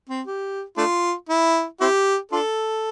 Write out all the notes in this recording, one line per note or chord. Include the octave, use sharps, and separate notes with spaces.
C4
G4
A3 D4 F4
E4
C4 E4 G4
D4 F4 A4